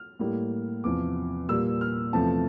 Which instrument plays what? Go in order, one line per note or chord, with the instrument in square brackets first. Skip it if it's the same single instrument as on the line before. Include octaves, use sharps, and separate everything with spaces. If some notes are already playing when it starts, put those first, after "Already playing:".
Already playing: [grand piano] F6
A2 G3 A#3
E2 C3 F3 D6
A#2 G3 A#3 E6
F6
E2 C3 F3 A3 A5